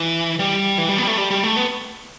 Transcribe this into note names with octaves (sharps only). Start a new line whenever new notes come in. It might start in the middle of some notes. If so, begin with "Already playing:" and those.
Already playing: E3
G3
E3
G3
B3
G3
A3
G3
G3
A3
B3